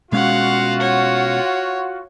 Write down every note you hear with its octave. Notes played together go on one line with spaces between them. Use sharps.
B2 G#3 C#4 F4 F#4 F5 F#5
C#5 F#5